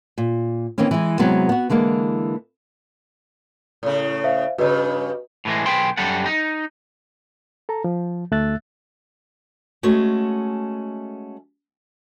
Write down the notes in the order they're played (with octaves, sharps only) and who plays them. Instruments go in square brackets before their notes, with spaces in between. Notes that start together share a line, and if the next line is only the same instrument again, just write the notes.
[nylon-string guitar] A#2
D#3 E3 A#3 C4 C#4
E3 G#3
C3 F#3 G#3 B3 C4
B3 F#4
D3 E3 G#3 A#3
[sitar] A2 C#3
[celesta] C5 E5 F5
[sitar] G2 C#3 [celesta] F#4 B4 D#5
[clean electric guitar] A2 E3 G#3
B1 G#4 B4 G5 C6
F#2 G3 G4 A4 F#5
D#4
[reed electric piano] A4 A#5
F3
D2 A3 E5 E6 F#6 A6
[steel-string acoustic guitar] G#3 A3 C#4 F#4 A4